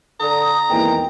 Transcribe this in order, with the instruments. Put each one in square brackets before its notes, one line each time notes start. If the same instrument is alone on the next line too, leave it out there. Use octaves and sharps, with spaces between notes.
[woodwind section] D3 [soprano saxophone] A#5 [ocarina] D#6
[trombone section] G#1 E2 A#3 [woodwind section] E3 G#3 [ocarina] G5